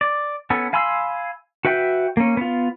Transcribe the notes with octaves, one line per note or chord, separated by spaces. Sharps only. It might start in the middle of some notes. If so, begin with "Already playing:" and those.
D5
B3 C#4 A4
F5 G#5 B5 C6 E6
F#4 B4 E5 G5
A#3 C#4
B3 F4